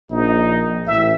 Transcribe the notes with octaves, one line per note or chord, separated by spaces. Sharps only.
A#1 D#4
A1 E5